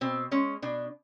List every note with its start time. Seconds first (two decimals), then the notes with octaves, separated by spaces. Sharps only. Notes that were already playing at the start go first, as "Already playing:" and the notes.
0.01 B2 C4
0.31 G#3 C#4
0.62 B2 D4